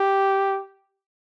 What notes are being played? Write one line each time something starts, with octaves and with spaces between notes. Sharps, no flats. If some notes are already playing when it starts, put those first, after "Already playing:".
Already playing: G4